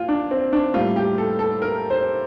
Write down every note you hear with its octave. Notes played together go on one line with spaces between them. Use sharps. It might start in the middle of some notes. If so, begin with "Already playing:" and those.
Already playing: A#2 F4
D4
C4
D4
A2 G3 A#3 F4
G4
A4
A4
A#4
C5